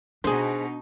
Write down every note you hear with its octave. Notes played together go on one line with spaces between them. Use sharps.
B2 D4 D#4 G#4 C5